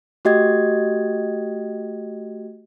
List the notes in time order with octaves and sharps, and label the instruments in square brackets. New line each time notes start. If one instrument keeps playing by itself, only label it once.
[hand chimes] A3 F#4 G4 D#5 G5 G#6